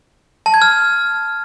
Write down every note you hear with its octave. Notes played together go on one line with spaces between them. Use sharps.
A5
G#6
F6